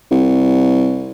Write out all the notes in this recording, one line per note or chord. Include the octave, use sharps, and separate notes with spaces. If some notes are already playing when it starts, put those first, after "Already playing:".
C2